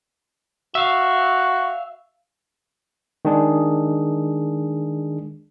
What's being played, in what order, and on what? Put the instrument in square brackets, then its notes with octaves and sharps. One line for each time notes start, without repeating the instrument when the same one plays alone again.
[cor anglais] F#4 [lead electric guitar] E5 F5
[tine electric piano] D#3 G#3 D4 G#4